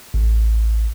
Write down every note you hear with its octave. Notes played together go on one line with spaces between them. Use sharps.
A1